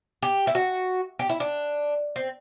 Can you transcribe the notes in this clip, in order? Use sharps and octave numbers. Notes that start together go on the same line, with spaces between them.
G4
E4
F#4
G4
E4
D4
C4